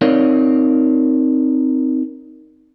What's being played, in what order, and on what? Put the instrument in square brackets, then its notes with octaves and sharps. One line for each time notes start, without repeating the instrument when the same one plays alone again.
[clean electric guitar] C4 D#4 A#4 C#5 D5 F5